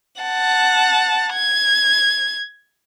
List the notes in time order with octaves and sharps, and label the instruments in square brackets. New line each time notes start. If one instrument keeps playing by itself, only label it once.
[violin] F#5 A5
G#6